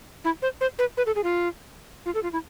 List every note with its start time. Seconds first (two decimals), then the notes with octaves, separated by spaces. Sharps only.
0.24 E4
0.42 C5
0.61 C5
0.79 B4
0.97 B4
1.06 A4
1.15 G#4
1.24 F4
2.05 F4
2.14 A4
2.23 F4
2.33 E4